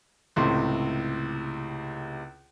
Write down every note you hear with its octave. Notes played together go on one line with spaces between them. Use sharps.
C#2 A2 C3 C6